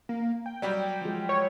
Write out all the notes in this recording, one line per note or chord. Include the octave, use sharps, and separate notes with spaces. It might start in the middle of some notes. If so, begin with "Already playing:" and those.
A#3
G5
F#3 G3 G4 D5
F3 G#3
C#5